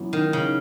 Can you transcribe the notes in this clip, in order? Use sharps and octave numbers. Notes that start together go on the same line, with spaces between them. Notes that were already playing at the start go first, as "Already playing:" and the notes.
Already playing: F#2 E3 B3 F#4
D#3
C#3